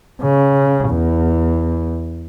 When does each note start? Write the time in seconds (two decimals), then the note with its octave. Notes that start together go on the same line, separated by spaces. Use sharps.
0.22 C#3
0.90 E2